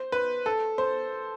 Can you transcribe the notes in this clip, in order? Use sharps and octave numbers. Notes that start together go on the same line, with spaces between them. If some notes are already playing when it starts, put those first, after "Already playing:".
Already playing: C5
B4
A4
C5